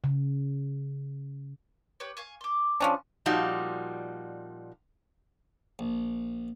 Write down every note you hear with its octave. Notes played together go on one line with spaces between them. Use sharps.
C#3
G4 B4 C#5
F5 G#5 C#6
C6 D6
F3 C#4 D4
A#2 F3 G3 D#4 F#4
A#1